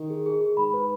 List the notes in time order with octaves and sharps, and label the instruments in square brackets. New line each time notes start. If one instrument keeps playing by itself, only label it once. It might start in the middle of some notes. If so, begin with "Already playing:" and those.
Already playing: [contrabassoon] D#3
[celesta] G#4
G#4
G#4
[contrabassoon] G#2 [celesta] B5
[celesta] B4